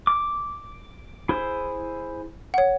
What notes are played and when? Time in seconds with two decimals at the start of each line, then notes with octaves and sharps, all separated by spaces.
0.07 D6
1.29 E4 G#4 C5
2.54 C#5 F#5